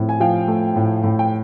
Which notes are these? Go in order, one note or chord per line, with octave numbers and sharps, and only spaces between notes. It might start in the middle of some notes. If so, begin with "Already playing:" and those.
Already playing: A2 F3 C4
G#5
F3 F5 G5
A3
A2
A2
G5